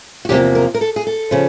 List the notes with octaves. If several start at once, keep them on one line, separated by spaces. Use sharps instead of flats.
F#4
E2 C3 F3 A#3 G4
A#4
A#4
A4
G#4
A4
C#3 F3